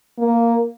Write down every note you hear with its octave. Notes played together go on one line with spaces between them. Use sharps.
A#3